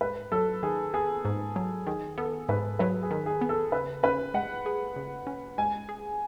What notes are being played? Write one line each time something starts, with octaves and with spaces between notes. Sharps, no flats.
G#2 B4
F#3 A4
D#3 G#4
B3 G#4
G#2
F#3
D#3 G#4
B3 A4
G#2 B4
F#3 B4
G#4
D#3
G#4
B3
A4
C#3 B4
C#4 B4
G#3 F#5
G#4
C#3
C#4
G#3 G#5
G#4